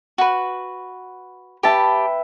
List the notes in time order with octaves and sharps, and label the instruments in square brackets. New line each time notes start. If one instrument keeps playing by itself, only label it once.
[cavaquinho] F#4 B4
[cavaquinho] G4 A5 [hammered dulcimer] B4 E5 G5